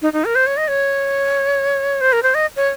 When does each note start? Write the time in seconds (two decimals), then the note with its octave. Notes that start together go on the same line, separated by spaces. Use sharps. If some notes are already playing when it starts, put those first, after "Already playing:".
0.02 D#4
0.13 D#4
0.25 A#4
0.35 C5
0.47 C#5
0.57 D#5
0.68 C#5
2.01 C5
2.13 A#4
2.23 C5
2.35 D#5
2.56 C#5